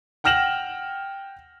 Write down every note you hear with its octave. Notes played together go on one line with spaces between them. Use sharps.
F#5 G5 F6 A#6 E7 F#7